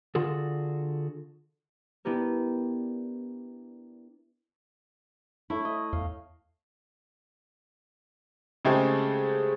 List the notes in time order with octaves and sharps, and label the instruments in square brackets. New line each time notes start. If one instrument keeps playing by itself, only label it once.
[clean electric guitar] D3 F4 F#4 G#4 A4
[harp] B3 D4 E4 G4 A#4
[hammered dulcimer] A3 E5 [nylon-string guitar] E4
[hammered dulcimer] D#5
[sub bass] E2 [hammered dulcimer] F5
[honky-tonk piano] C#3 G#3 A3 C4 G4 G#4